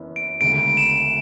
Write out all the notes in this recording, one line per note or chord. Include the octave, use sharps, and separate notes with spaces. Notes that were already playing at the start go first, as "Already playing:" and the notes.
Already playing: F#1 F#2 E3 B3
D7
E1 D2 C#3 G#3 D7
E7